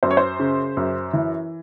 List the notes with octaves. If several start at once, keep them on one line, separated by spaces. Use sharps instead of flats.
F#2 C5
C#5
C5
C#3
F#2
E3